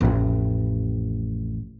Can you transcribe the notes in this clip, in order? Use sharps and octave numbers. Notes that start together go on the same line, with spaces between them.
A1 F2